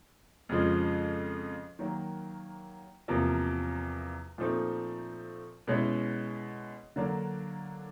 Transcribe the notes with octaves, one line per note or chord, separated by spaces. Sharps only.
F2 C#3 F3 G#3
D#3 F#3 A#3
E2 C3 F3 A#3
A#2 F3 A3 C4 D#4
B2 G#3 C#4 E4
D3 F#3 A#3 D4